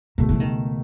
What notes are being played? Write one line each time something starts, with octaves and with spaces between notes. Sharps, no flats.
C#2 B2 D#3 A3
E3
D#3